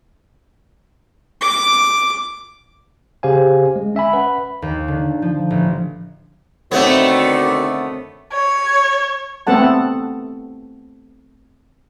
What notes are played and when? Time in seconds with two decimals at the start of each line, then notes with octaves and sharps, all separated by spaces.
1.41 D6
3.23 C#3 G4 C5 F5 G#5
3.76 G#3
3.95 C#4 E5 G#5 B5
4.13 B4 F#5 B5
4.62 D#2
4.88 D3
5.22 F3
5.50 A1
6.72 B2 D3 D#3 A3 B3 C4 C#5
8.33 C#5
9.47 A3 B3 C4 A4 F#5 A5